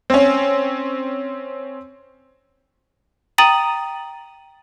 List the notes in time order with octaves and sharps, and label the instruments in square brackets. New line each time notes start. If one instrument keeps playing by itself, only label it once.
[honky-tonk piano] C4 C#4
[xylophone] G5 A#5 D#6 A6 D#7 F#7